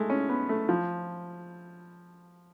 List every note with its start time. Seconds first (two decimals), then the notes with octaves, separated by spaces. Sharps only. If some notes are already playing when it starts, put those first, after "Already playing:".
Already playing: G#3 A3
0.10 C#4
0.29 B3
0.49 A3
0.69 F3